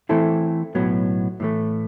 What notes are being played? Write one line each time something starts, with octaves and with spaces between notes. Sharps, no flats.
E3 A3 C4 E4 A4
B1 A2 F#3 B3
A2 E3 A3